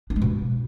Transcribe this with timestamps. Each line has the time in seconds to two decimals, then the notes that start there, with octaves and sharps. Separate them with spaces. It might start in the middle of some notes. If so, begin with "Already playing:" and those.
0.10 D4
0.16 G#3
0.22 B2